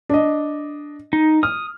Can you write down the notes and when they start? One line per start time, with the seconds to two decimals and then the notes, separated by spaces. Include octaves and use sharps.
0.09 D4 D#5
1.13 D#4
1.43 D#6 F6